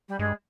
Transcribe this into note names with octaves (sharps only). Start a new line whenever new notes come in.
G3
G2 G#3